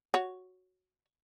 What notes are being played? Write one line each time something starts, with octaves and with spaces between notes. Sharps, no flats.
F#4 C#5